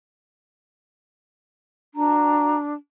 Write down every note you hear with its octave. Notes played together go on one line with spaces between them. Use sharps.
D4 F#4 A5 A#5